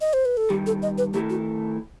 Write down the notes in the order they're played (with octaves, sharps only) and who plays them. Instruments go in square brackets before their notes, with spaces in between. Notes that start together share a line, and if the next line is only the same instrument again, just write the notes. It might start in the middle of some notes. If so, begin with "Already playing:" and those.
[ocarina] D#5
C5
B4
A4
[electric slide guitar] G2 D#3 G3 [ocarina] G4
[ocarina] A4
D#5
B4
[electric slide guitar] D#3 A3 E4 A4 [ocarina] G4
[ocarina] F#4